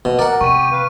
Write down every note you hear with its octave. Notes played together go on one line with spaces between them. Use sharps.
B2 D#3
A#4 D5 F#5
C3 G4 G5 C#6 D#7
B4 F5